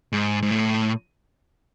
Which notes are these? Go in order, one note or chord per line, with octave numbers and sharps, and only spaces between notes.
G#2
G#2
A2